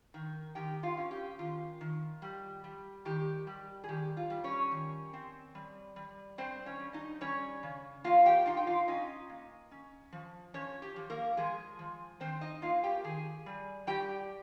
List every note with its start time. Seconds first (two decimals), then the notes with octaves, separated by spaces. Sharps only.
0.14 D#3
0.55 D#3 G4 G5
0.83 F4 F5
0.97 C#4
1.11 G4
1.39 D#3 F4
1.81 D#3
2.22 G3
2.64 G3
3.05 D#3 G4
3.47 G3
3.84 G#4
3.89 D#3 G4
4.17 F4
4.30 G3
4.44 C#4 C#5
4.71 D#3
5.13 C4
5.55 G3
5.96 G3
6.38 G3 C4 C5
6.66 C#4 C#5
6.79 G3
6.93 D#4 D#5
7.21 G3 C#4 C#5
7.63 C#3
8.04 A#3 F4 F5
8.26 G4 G5
8.46 D#4 F4 F5
8.57 G5
8.67 F4 F5
8.88 C#4 D#4 D#5
9.30 A#3
9.71 C#4
10.12 F3
10.54 F3 C#4 C#5
10.82 G4
10.96 F3
11.10 A#3 A#4
11.37 F3 G#3 G#4
11.79 F3
12.20 D#3 C4 C5
12.41 D#4 D#5
12.62 A#3 F4 F5
12.83 G4 G5
13.04 D#3 G#4 G#5
13.46 G3
13.87 G3 G4 G5